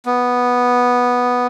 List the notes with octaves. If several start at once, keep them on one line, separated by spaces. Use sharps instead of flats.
B3